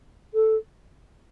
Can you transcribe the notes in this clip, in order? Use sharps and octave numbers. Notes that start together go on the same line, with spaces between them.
A4